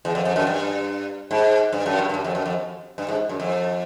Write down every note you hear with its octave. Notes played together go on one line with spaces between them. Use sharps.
E2
F2
F2
F#2
G2
G#2
G2
F#2
G2
G2
F#2
F2
F#2
F2
G2
G#2
F#2
F2